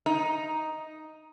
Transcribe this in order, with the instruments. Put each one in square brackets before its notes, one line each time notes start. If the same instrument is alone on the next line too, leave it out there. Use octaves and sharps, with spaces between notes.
[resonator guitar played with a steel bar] D#4